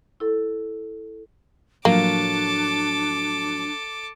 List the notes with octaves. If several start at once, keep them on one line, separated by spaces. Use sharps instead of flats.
E4 A4
A2 F3 F#3 A#3 D4 A4 D6